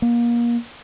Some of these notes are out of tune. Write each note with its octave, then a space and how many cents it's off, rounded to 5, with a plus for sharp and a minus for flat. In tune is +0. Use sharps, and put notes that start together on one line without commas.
A#3 +30